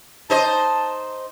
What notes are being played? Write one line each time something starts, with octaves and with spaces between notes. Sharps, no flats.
D#4 C5 D#5 A5